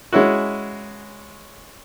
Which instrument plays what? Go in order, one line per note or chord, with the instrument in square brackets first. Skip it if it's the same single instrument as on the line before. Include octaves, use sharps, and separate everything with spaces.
[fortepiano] G#3 C#4 E4 F#4